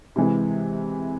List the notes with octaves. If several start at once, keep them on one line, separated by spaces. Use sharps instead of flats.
C3 E3 G#3